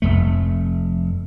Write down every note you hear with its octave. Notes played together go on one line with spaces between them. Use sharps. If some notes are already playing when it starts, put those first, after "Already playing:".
F1 F2 A3